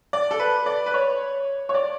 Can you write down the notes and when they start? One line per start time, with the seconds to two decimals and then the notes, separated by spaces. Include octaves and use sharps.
0.13 D5
0.31 A4
0.40 B4
0.66 D5
0.86 B4
0.94 C#5
1.69 C#5
1.74 D5